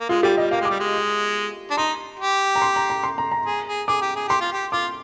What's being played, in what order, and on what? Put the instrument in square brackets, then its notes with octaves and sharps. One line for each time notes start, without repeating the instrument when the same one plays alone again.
[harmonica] A#3
[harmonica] G#3 [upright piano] F4
[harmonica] G3 [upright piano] G4
[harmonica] G3 [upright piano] D#5
[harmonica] A#3 [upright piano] F5
[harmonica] G#3 [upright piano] D6
[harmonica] G3
G#3
D4
[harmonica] D#4 [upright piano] C6
[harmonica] G4
[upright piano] A#5
C6
A#5
A#5
C6
A#5
A#5
[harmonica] G#4
G#4
[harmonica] G#4 [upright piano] D6
[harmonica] G4
G#4
[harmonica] G4 [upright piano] C6
[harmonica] F4
G4
[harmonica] F4 [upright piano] D6